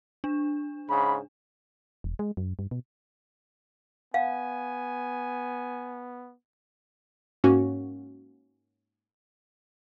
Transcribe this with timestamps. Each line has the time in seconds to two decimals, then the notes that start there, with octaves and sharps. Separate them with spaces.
0.24 D4
0.89 G#2 C#3 B5
2.04 E1
2.19 G#3
2.37 F#2
2.59 G2
2.71 B2
4.14 B3 F5 F#5 G#5
7.44 G#2 A#3 C#4 F#4